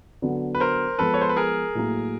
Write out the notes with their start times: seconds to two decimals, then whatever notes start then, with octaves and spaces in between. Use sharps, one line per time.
0.22 D3 F#3 B3 D4
0.55 B4
0.60 A#4 C5
0.99 F3 G#3 B3 A4 B4
1.14 C#5
1.21 C5
1.29 B4
1.36 G#4 A#4
1.75 A2 F#3 A#3